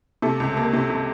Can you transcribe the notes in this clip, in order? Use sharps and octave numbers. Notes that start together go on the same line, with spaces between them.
C3 A3 A4
C#2
A#3
C3
C3